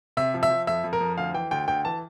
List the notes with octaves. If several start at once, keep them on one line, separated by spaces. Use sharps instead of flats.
C3 E5
F3
E5
F3
F2 E5
F2
A#4
F2
D2 F5
E3 G5
D2 G5
D2 G5
E3 A5